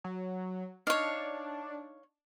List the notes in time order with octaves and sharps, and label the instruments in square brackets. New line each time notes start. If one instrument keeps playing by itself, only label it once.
[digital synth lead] F#3
[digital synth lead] D4 [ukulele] D#4 [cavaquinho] C#5 F5